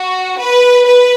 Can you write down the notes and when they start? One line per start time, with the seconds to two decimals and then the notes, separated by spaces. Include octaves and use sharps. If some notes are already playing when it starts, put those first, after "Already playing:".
Already playing: F#4
0.38 B4
0.86 B4